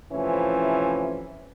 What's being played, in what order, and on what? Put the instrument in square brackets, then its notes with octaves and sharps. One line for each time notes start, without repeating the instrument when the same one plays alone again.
[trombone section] A2 C3 E3 F3 C#4